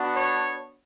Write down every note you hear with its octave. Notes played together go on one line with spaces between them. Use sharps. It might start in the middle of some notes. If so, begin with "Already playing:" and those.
Already playing: B3 D4 F#4
C#5